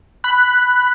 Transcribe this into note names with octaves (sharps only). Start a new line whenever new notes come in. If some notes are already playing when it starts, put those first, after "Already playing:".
B5 F#6